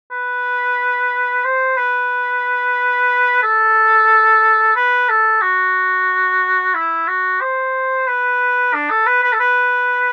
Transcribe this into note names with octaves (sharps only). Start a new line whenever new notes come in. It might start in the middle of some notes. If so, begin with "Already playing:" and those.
B4
C5
B4
A4
B4
A4
F#4
E4
F#4
C5
B4
D4
A4
B4
B4
A4
B4